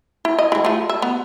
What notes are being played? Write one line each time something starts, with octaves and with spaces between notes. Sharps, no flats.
E4
D#5
E3 G#3
F3 A3
E5
B3